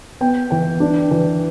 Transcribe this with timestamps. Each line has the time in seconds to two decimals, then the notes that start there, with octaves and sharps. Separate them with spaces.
0.21 B3 G5
0.50 E3 G5
0.80 D4
1.11 E3